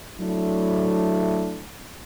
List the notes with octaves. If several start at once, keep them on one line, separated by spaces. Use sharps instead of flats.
F#3 A3 D4 E4